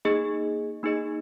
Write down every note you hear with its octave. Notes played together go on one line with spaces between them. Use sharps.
A#3 D#4 G#4 D#5
A#3 D#4 G#4 D#5